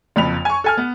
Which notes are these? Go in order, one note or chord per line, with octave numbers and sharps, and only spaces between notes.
F#1 F2 B5 F7
G#5 C#6
A4 G#5 F6
B3